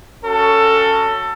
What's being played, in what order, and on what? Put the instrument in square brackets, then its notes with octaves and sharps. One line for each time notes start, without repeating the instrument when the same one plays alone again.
[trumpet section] C#4 F#4 A4